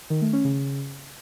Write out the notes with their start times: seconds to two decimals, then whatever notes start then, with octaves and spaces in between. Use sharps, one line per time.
0.10 D#3
0.22 A3
0.33 C#4
0.44 C#3